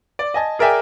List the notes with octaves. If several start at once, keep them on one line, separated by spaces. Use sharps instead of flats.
D5
D#5 G#5 A5
G#4 A#4 D5 E5 G5 G#5